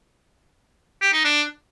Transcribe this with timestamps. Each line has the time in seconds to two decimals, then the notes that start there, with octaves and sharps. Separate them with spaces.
1.02 G4
1.13 D#4
1.25 D4